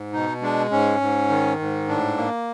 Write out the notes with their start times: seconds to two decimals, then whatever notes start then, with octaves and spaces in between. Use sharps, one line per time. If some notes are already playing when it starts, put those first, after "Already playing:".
Already playing: G#2
0.13 B2 D#4
0.42 G#3 D4
0.71 G#2 C#4
1.01 G#2
1.29 D#3
1.59 G#2
1.88 A2 D4
2.17 A#3